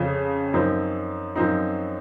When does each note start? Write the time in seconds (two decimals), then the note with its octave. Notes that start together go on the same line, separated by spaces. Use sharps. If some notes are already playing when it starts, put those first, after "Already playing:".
Already playing: F2 C#3 F3
0.54 F#2 F3 C4 D#4
1.36 F#2 F3 C4 D#4